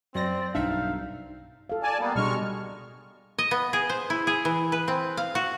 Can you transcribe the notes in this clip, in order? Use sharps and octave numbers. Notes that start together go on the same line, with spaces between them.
F#2 C4 C5 D5 A#6
B1 G2 D4 D#4 E5 F5
A4 F5
D5 G#5 A5
G3 A#3 B3
B2 G3 G#3 D4 C#6 F6
D#5
B3
G#4
C5
E4
G#4
E3
B4
C4
F5
F#4